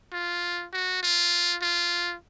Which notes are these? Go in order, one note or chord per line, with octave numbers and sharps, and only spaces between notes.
F4
F#4
F4
F4